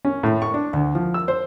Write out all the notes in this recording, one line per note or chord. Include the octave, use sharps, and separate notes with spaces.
C#4
A2
C#6
D4
D2
F3
E6
C5